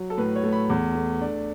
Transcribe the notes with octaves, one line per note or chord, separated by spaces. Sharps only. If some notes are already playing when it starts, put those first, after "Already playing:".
Already playing: F#3
A4
A2 B4
C#5
A3
B5
E2
A3
D4